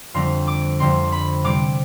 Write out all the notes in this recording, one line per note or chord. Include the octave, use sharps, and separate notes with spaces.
F2 D3 G3 C4 C6
D6
F2 D3 G3 C4 C6
B5
C3 G3 C4 D6